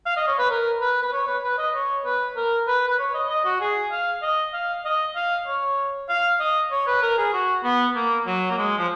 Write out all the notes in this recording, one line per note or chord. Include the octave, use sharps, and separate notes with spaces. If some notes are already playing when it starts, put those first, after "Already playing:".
F5
D#5
C#5
B4
A#4
B4
B4
C#5
B4
B4
D#5
C#5
B4
A#4
B4
B4
C#5
D#5
D#5
F#4
G#4
F5
D#5
F5
D#5
F5
C#5
F5
D#5
C#5
B4
A#4
G#4
F#4
B3
A#3
F#3
A#3
G#3
F3